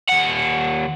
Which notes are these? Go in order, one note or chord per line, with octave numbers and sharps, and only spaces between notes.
D#2 F#5